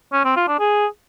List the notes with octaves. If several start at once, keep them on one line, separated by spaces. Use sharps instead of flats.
C#4
C4
F4
D4
G#4